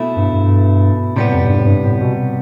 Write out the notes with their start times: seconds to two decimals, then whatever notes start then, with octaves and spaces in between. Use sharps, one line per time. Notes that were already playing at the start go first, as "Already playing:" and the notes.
Already playing: B2 A3 E4
0.17 G2
0.33 G2
1.16 A2 C3 G3 B3
1.34 F2
1.45 A2
1.50 G2
1.58 A2
1.66 G2
1.84 A2
2.01 B2